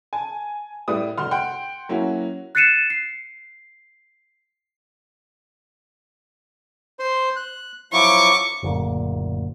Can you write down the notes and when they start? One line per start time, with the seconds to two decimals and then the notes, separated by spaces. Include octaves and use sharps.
0.13 G#5 A5
0.88 A2 G3 E4 B4 D#6
1.18 F1 F#4 C6 F6
1.31 F#5 G5 C6
1.89 F#3 A#3 C#4 E4 F#4
2.55 F#6 A6 C7 C#7 D#7 E7
2.90 C7
6.99 C5 C6
7.36 F#6
7.92 F3 F#3 E4 C#6 D6
8.63 F#1 D2 A#2